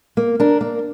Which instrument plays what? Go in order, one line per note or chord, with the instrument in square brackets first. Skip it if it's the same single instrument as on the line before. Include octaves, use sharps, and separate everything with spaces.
[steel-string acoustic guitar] A#3
D4 A#4
A#3